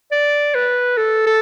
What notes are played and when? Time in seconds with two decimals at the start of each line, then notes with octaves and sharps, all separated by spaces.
0.12 D5
0.55 B4
0.97 A4
1.26 A4